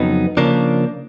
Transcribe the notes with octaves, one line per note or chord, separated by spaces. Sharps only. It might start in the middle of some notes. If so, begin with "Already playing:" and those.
Already playing: F2 C#3 F#3 B3 D#4
C#3 F3 A#3 D4